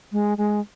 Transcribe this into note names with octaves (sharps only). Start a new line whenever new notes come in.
G#3
G#3